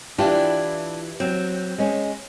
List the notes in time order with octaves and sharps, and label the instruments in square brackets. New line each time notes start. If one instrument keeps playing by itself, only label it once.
[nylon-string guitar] E3 F4 G4 [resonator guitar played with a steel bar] D4 E4
[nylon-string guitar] F#3 [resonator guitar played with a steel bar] C4
[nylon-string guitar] G#3 C#4